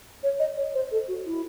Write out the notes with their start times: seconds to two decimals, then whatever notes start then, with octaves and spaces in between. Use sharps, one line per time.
0.23 C#5
0.39 D#5
0.57 C#5
0.74 C5
0.91 A4
1.08 F#4
1.26 E4